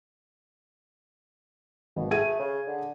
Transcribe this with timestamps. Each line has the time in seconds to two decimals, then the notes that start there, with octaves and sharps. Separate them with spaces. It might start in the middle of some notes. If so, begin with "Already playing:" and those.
1.96 G#1 B2
2.11 A3 G#4 G#6 D#7
2.39 C#3
2.67 D3